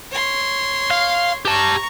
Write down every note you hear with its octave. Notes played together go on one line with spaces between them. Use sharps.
C#5 C6
F5
G4 A5 A#5 C#6